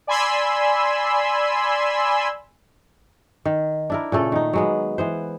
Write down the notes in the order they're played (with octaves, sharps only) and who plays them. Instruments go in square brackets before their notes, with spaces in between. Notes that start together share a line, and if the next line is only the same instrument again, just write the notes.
[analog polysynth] D5 G#5 B5 C6 E6
[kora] D#3
D4 E4 A#4
A#2 C#3 A3 A4
D#3 D#4
F#3 G#3 B3
E3 B3 C5